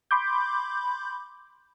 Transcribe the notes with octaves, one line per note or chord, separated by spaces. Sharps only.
B5 C6 D6 G6